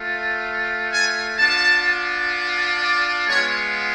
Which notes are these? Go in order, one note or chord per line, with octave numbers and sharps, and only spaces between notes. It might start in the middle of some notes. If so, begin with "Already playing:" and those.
Already playing: A3 F4
G#5
B3 D4 F4 A5
D5
G#3 B3 F4 C#5